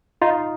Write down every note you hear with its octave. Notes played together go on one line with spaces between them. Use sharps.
D#4 F4